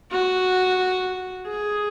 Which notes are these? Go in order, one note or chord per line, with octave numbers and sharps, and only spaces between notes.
F#4
G#4